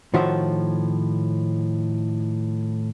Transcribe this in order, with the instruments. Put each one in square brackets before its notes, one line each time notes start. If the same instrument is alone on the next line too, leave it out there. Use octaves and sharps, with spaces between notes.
[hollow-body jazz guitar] A2 D#3 F3 F#4 C5 E5